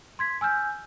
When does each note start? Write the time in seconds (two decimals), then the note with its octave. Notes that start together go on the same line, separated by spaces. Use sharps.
0.19 C6 G#6 B6
0.41 G#5 E6 F6 G6